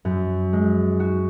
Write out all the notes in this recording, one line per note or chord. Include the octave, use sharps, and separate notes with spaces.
F#2
G#3
F#4